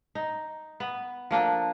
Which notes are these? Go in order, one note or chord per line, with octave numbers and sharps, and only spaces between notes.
D#4
B3
F3 A#3 D4 A4